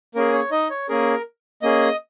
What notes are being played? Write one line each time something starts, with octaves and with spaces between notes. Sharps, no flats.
A#3 C#4 G#4 A#4
C#5
D#4 D#5
C#5
A#3 C#4 G#4 A#4
A#3 C#4 G#4 D#5 D#6